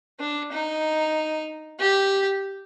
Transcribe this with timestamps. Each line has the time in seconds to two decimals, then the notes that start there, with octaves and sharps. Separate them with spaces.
0.20 D4
0.52 D#4
1.80 G4